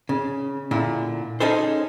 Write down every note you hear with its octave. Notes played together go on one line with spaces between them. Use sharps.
C#3
A#2 D3 E4
C#4 D#4 G#4 A4 C5